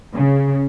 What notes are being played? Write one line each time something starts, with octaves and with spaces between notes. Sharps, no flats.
C#3